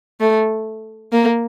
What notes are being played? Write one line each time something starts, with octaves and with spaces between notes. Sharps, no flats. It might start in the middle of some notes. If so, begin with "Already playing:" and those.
A3
A#3